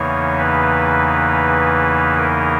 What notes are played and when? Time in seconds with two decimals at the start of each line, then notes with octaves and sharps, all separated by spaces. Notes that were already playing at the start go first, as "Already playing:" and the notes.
Already playing: E2 C#3 E3 A#3 D#4 C#5
0.38 B4
2.18 A#4